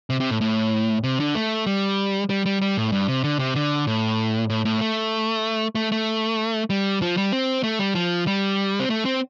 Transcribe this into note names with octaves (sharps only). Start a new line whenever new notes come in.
C3
C3
A2
A2
C3
D3
A3
G3
G3
G3
G3
A2
G2
C3
D3
C3
D3
A2
A2
A2
A3
A3
A3
G3
F3
G3
C4
A3
G3
F3
G3
C4
A3
C4